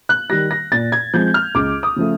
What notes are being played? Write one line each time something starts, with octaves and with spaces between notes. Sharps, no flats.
F#6
D#3 G3 A#6
A#6
A#2 A6
G#6
F3 G#3 C4 G6
F6
C#2 D6
D#6
C#3 F3 A3